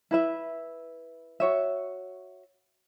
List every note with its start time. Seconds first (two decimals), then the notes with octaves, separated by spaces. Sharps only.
0.11 E4 B4 E5
1.40 F#4 C#5 E5